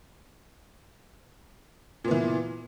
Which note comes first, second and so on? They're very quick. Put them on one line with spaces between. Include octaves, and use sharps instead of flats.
A#2 B3 E3